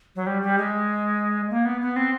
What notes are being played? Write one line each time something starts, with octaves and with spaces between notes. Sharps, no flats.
F#3
G3
G3
G#3
A#3
B3
B3
C4